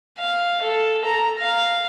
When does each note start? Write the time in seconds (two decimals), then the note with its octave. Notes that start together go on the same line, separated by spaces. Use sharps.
0.18 F5
0.62 A4
1.05 A#5
1.38 F5